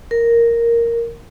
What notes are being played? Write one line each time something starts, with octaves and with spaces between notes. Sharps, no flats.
A#4